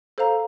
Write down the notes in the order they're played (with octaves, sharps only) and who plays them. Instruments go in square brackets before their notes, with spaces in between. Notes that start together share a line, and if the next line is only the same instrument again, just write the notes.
[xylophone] A4 C5 F5 A#5